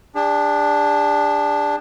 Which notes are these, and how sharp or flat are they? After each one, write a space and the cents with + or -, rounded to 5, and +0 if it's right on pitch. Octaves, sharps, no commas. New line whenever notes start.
D4 +0 G#4 -45